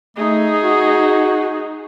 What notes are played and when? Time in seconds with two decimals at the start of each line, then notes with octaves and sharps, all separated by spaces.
0.17 A3 D#4 G#4
0.64 F#4